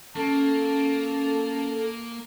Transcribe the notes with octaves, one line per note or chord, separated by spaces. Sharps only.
A#3 C#4 A4 A5